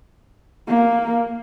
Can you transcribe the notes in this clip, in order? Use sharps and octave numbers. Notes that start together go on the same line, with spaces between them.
A#3